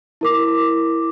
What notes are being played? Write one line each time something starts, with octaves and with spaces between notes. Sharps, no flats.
E4 A#4 D6